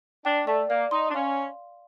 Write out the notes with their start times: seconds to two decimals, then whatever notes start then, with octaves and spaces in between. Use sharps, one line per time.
0.25 D4 G5
0.47 A3 D5
0.69 A#3 D5
0.91 D#4 C6
1.09 D4
1.14 C#4 F5